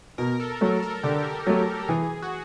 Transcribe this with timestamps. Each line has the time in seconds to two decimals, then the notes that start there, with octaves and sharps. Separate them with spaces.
0.18 B2 A#4
0.40 A4
0.61 F#3 A3
0.83 A#4
1.03 D3 G4
1.47 F#3 A3
1.77 G4
1.89 E3 G#4
2.22 F#4